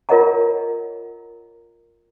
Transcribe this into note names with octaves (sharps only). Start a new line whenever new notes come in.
F4 A#4 C#5 D#5 F#5 A#5